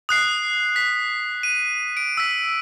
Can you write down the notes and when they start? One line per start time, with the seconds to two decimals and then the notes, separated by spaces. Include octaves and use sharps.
0.09 D#6 F#6 C7
0.76 B6
1.43 D#7
1.97 D7
2.17 E6 B6